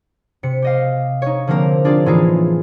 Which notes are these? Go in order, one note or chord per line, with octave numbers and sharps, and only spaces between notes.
C3 C#7
G4 D#5 F5
D#4 C#5
D3 F3 A#3 C4 A#4
D4 F4 G#4 D5
A2 E3 A3 D#4 F4 G#4